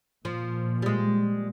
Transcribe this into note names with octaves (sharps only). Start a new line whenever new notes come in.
A#2 F3
G3 G#3